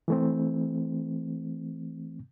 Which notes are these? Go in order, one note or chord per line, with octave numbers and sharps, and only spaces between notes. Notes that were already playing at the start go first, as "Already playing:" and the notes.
E3 A3 C4